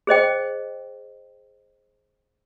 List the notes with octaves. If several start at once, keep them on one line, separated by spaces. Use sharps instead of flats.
G#4 C5 D#5 G5